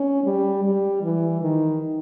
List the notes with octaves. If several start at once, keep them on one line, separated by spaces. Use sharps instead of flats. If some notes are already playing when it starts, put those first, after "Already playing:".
Already playing: C#4
G3
G3
E3
D#3